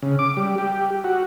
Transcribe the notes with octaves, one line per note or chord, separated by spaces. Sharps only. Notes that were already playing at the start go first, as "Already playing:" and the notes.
C#3
D6
G3
G4
F#4